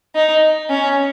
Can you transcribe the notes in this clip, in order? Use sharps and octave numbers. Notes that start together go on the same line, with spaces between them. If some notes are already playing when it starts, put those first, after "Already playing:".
D#4
C#4